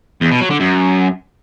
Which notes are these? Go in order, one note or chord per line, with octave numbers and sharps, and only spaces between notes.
E2
B2
F#3
D3
F#2